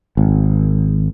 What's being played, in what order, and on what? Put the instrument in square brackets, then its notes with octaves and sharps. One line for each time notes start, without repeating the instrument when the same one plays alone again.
[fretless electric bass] G#1